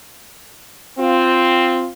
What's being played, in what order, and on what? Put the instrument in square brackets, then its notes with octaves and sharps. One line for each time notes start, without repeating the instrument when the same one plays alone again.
[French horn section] C4 F4